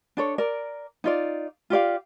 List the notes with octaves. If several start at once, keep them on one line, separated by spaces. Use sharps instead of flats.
D4 A4 C#5
A#4 D5
D#4 F4 D5
F4 G4 D5 F5